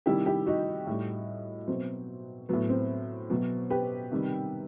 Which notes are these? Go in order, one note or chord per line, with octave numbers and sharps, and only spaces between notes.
C3 D#3 G3 E4 G4
E4 G4
D#4 F#4
A2 G3
B2 F#3 C4
A2 F#3 B3
C4
B2 F#3
G4 B4
C3 D#3 G3